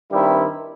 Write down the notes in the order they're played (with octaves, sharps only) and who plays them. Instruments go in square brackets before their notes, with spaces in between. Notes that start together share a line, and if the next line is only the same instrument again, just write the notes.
[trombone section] G2 D#3 G3 C4 E4